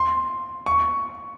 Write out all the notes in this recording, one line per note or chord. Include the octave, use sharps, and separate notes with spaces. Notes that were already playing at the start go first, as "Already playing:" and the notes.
Already playing: C6
C#6